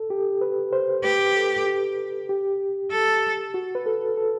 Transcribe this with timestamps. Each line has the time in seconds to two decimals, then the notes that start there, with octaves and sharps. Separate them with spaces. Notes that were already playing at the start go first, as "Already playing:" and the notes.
Already playing: A4
0.10 G4
0.41 B4
0.73 C5
1.04 G4 B4
1.36 A4
1.67 G4
2.29 G4
2.92 A4
3.54 F#4
3.75 B4
3.86 A4
4.17 A4